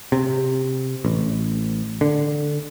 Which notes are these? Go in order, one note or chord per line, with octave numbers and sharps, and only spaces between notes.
C3
A1
D3